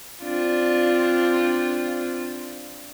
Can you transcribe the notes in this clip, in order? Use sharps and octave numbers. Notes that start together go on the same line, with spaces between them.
C4 D4 F4